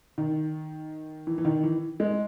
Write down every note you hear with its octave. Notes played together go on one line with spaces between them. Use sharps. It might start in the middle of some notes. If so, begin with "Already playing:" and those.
D#3
E3
E3
D#3
E3
G#3